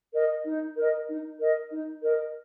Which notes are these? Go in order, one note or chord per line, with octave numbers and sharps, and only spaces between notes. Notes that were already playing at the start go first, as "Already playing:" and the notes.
A#4 D#5
D#4
A#4 D#5
D#4
A#4 D#5
D#4
A#4 D#5